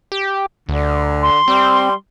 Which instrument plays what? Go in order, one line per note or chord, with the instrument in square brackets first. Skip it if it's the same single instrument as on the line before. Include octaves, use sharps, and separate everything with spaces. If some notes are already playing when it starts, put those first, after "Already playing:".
[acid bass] G4
[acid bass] D2 [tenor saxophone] D3
[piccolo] C6
[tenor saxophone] G3 [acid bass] C4